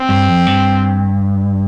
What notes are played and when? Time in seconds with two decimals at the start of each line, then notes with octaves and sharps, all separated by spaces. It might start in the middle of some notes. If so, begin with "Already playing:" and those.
Already playing: C4
0.09 G2
0.28 F2
0.47 G2